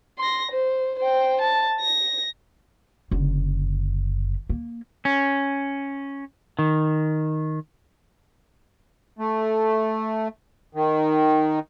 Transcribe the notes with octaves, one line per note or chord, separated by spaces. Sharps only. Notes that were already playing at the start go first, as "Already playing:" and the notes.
C6 A#6
C5
C5 G5
A5
A#6
F#1 D3
A#3
C#4
D#3
A3
D#3